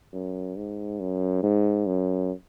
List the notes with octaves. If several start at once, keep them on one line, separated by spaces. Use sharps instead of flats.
F#2
G#2
F#2
G#2
F#2